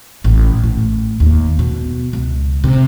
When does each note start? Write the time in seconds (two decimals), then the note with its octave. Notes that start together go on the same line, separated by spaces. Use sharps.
0.24 A1
0.63 A2
1.20 D#2
1.59 B2
2.13 C#2
2.64 C3